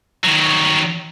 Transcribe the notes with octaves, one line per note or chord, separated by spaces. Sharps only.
D#3 F#3